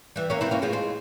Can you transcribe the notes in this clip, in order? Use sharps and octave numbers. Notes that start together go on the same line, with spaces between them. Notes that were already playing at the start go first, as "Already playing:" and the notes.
E3 G3
A#3 C#4
C4 E4
A#3 C#4
F3 G#3
G#3 C4